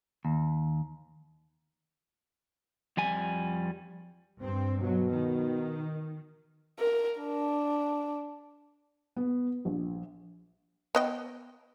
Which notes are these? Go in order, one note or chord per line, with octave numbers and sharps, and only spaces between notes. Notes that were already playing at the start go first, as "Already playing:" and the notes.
D#2
F2 G3 G#5
G2 C4
B2 F#3
D#3
A#4
D4
B3
A#1
B3 D#5 G5